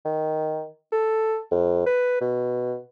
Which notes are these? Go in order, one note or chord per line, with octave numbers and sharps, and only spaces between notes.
D#3
A4
F2
B4
B2